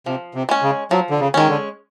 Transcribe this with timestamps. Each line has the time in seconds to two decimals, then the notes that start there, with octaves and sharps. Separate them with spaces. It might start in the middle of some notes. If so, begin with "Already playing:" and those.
0.06 C3 F3
0.35 C3
0.49 G#3 C#4
0.62 C#3
0.91 F3 F#3
1.10 D3
1.20 C#3
1.34 D#3 G#3 C#4
1.48 D3